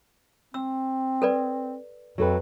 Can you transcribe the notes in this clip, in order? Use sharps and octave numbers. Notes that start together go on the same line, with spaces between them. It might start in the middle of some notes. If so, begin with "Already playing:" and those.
C4 E6
A4 B4 D5
F2 F#3 A4 B4